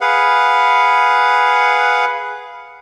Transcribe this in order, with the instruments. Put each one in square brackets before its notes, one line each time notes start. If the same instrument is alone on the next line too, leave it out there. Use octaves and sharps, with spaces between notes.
[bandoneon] G#4 B4 F5 F#5